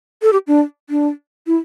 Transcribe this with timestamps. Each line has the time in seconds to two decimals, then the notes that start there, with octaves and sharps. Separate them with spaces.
0.22 A4
0.33 G4
0.47 D4
0.90 D4
1.47 E4